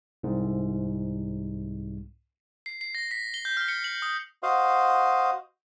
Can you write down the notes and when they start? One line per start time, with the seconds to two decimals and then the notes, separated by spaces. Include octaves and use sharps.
0.23 C2 G#2
2.66 C7
2.81 C7
2.95 A#6
3.11 B6
3.34 G7
3.45 G6
3.57 F6
3.68 C#7
3.84 F#7
4.02 D#6
4.43 F#4 C5 D#5 F5